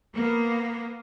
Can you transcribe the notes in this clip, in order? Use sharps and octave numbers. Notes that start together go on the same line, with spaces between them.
A#3 B3